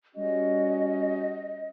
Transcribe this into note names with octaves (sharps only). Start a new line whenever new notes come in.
G3 C#4 F#4 D#5